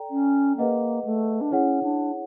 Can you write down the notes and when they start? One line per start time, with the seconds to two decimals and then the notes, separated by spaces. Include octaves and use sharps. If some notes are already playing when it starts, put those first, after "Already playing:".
Already playing: A4 D5 G5 A#5
0.11 C#4
0.57 A#3 G#4 B4 D#5 F#5
1.05 A3
1.41 D4
1.52 C#4 E4 G#4 C#5 F#5
1.83 D4